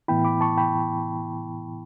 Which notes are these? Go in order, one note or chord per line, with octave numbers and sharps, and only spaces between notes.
A2 E3 B3 E4 G5 B5
B5 D6
A5 C#6
G5 B5